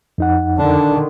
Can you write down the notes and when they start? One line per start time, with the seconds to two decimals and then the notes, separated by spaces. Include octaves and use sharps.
0.18 F2 D#4 F#5
0.58 D3 D#3 D4